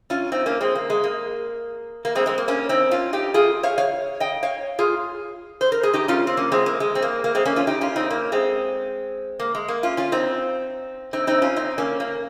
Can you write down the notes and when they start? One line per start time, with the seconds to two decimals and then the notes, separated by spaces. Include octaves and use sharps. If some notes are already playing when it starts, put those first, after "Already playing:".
0.10 C#4 F4
0.32 C4 D#4
0.46 A#3 C#4
0.61 G#3 C4
0.75 A#3
0.90 G#3
1.04 A#3
2.05 A#3
2.15 G#3 C4
2.26 G#3 C4
2.38 A#3
2.48 A#3 C#4
2.69 C4 D#4
2.91 C#4 F4
3.13 D#4 G4
3.34 F4 G#4
3.63 C#5 F5
3.78 C#5 F5
4.20 D#5 G5
4.43 C#5 F5
4.79 F4 G#4
5.61 C5
5.72 A#4
5.83 G#4
5.94 D#4 G4
6.08 C#4 F4
6.27 C4
6.37 A#3 C#4
6.52 G#3 C4
6.66 A#3
6.80 G#3
6.95 C4
7.02 A#3
7.24 A#3
7.35 G#3 C4
7.45 A#3 C#4
7.56 C#4 F4
7.67 D#4 G4
7.81 C#4 F4
7.96 C4 D#4
8.10 A#3 C#4
8.32 G#3 C4
9.40 A#3
9.55 G#3
9.68 A#3
9.83 C#4 F4
9.97 C#4 F4
10.12 C4 D#4
11.13 C4 D#4
11.27 C4 D#4
11.42 C#4 F4
11.56 C4 D#4
11.78 A#3 C#4
12.00 A#3